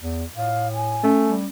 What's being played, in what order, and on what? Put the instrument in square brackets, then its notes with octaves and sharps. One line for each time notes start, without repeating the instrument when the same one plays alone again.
[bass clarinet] E2
[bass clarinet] A2 [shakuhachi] F5
[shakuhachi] G#5
[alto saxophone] A3 [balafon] C#4
[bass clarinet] G3